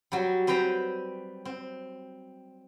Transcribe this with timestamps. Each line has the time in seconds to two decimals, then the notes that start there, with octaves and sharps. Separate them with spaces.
0.12 F#3 G3
0.47 C4 B4 C5 G5 A#5
1.45 C4